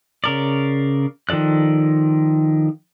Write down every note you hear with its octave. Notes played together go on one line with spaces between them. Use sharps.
C#3 A#4 D5
D#3 F3 A4 D5 F#6